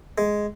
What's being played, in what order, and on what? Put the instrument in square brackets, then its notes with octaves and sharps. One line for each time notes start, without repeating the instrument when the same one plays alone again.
[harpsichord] G#3